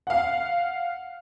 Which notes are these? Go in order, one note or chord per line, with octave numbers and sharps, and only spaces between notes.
F5 F#5